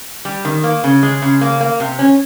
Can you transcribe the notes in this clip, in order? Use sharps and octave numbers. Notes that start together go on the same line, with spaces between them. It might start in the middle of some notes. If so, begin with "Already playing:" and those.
G3
D#3
A#3
C#3
G#3
C#3
A#3
A#3
C3
C#4